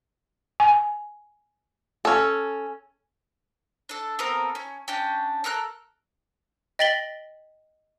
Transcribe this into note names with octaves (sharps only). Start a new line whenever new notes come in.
G#5
C#4 A4
D4 A4
B3 C4 A4 A#4
C#4
C#4 D4 G5
A4 A#4 F6 F#6
D#5 G5 A6 B6 F#7 G7